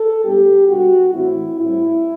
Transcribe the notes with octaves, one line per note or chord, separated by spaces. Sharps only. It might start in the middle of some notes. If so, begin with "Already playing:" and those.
Already playing: A4
A2 G3 B3 D4 G4
B2 G3 D4 F#4
A2 E3 A3 C4 E4
A2 G3 C4 E4